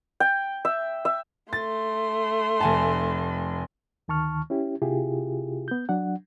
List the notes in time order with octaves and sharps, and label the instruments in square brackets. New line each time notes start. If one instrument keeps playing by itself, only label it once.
[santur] G5
E5
E5
[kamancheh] A3 C6 [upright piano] A6
[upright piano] F1 G#5 A5
[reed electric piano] D2 D#3 A5 C#6 F6
C#4 E4 G4
C3 E4 F4 G4 G#4
B3 G6
F#3 D4 F#5